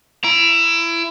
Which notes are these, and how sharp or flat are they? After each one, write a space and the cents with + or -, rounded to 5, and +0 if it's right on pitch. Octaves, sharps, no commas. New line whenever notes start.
E4 +25 A#5 +30